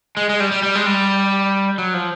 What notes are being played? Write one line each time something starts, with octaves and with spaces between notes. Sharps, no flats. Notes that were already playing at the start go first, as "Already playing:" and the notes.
G#3
G#3
G3
G3
G3
G#3
G3
F#3
F3